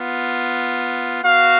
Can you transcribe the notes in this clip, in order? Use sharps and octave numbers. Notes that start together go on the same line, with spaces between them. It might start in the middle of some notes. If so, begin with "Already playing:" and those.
Already playing: B3 F4
B3 F#4 F5